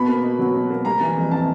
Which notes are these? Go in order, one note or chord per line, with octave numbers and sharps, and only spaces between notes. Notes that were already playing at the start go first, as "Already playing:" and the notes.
Already playing: B2 B3 B5
A#3
B2
F#3
B2
A#3
G3 A#5
E3
F2
C3 A5